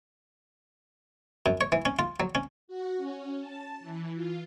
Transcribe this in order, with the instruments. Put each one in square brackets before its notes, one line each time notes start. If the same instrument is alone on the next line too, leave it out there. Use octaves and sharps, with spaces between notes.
[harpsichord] F#2
C#5
E3
C#4
F4
F#3
C#4
[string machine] F#4
C#4
A5
E3
F4